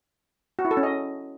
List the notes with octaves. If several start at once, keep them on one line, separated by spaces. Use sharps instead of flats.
F#4
E4
A4
C#4
D#5